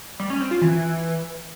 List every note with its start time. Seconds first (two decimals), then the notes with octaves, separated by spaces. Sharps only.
0.20 G3
0.30 C#4
0.41 C4
0.51 F4
0.61 E3